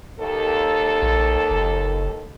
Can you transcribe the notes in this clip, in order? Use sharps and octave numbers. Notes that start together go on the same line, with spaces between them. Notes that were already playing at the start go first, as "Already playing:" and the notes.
D#2 A4
A#1
F#1